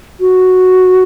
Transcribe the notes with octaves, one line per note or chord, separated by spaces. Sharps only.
F#4